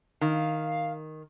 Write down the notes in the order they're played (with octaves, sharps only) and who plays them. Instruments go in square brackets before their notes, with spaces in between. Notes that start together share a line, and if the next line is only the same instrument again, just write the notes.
[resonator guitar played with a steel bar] D#3 [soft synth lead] F5